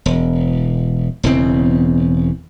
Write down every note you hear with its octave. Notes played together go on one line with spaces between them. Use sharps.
E1
E1 E2 C#3 C4